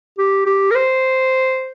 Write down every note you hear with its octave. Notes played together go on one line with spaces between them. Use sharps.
G4
G4
A#4
C5